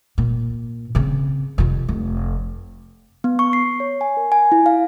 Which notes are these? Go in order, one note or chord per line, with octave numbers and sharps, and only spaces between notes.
A#2
C#3 C4
F2 C3
F1
B3
C#6
C7
C#5
G#5
A#4
G#5
E4
F5